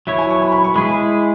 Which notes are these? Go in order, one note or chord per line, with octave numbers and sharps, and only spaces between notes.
F#3 E4 C#5 E5
G#5
C#6
B5
B5
C#6
G#3 E4 G#4 B5